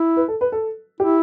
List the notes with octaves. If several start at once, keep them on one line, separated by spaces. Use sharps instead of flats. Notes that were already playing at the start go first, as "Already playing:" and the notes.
Already playing: E4
B4
A4
B4
A4
E4 G4